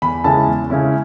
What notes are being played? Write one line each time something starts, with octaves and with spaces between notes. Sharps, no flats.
E2 B5
C#3 G#3 C#4 E4 A5
E2
C#3 G#3 C#4 E4